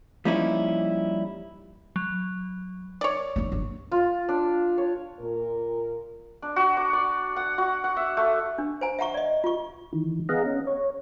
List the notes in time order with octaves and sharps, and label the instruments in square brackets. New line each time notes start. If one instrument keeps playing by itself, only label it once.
[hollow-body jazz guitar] F3 G3 A#3 C#4 D#4 E4
[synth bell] F#3
[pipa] C#5 D5
[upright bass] D#2 C4
G1
[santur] F4
D4
C#5
[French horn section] A#2 A#4
[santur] D4
F#4
D6
D5
F#5
F#4
F#5
E5
A3
[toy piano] D4
C5 G#5 A#5
E5 F#5 A#5 C#6
D5 D#5
F4 C#6
[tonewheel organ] D#3 E3
B3 G#4 D#5 F5 F#5 A#5
C#4
C#5